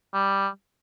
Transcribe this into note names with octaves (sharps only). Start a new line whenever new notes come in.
G3